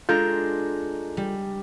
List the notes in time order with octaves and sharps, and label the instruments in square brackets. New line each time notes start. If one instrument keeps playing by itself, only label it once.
[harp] G#3 D4 A#5 [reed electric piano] F4 A4 G6
[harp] G3